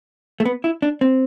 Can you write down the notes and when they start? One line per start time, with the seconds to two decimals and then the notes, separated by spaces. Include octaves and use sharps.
0.40 A3
0.45 B3
0.64 E4
0.82 D4
1.01 C4